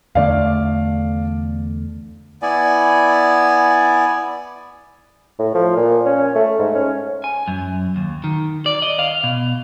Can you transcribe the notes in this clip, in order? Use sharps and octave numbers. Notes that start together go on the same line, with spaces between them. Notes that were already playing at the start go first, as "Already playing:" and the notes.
E2 D3 A3 D5 F5
B3 E4 D5 G#5
A2
F3
A#2
C#4
A3
G#2
C#4
G#5
F#2
D#2
D#3
D5
D#5
F5
B2